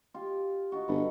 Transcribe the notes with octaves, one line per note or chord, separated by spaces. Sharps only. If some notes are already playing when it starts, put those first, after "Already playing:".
F4 G4
D#4 F4 F#4
G1 A4 B4 F#5